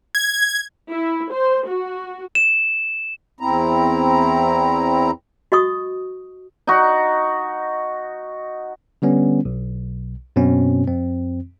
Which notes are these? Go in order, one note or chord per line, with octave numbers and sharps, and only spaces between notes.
G#6
E4
C5
F#4
E7
E2 C4 E4 A#5
F#4 D#5 C#6 D#6
D#4 F#4
D3 G3 B3 C#4
B1
F#2 B2 C4 C#4
F2 C4